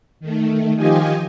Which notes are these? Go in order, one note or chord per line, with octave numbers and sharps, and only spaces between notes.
D#3 A3
D#3 F3 F4 G4 D#5 G#5